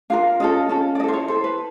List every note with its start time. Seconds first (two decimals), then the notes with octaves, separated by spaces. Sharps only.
0.10 D4 F4 A#4 F5
0.40 C#4 F4 A4 D#5
0.69 C#4 F4 A4
0.95 D5
0.99 E4 D#5
1.04 A4 C5
1.13 C#5
1.28 E4 A4 C5
1.44 B4